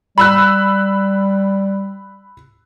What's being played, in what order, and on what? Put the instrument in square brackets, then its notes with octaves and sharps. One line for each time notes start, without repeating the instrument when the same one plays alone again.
[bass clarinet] G3 [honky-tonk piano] B5 E6 F#6